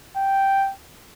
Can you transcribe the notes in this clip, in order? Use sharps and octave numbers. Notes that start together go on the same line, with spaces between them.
G5